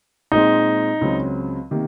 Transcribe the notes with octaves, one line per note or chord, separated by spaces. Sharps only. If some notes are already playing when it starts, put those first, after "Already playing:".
A#2 G#3 C4 D#4
C#2 C#3 F#3 C4
C3 D#3 A#3